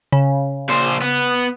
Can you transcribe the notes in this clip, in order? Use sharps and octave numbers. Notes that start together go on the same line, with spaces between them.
C#3
A#2 C5
B3